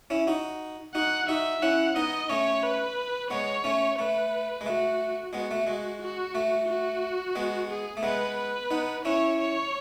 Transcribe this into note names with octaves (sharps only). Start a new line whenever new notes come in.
C#4 E4
D#4 F#4
D#4 F#4 F#5
D#4 F#4 E5
C#4 E4 F#5
B3 D#4 D#5
A3 C#4 C#5
B4
G#3 B3 C#5
A3 C#4
A3 B4
G#3
A3 F#4
G#3 B3 F#4
A3
G#3
F#4
A3
F#4
G#3 B3
G#4
A3
G#3 B3 B4
B4
B3 D#4
C#4 E4 C#5
C#5